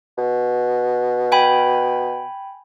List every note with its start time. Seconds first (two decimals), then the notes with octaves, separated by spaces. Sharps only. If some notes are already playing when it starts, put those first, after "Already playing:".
0.18 B2
1.32 G5 G#5 B5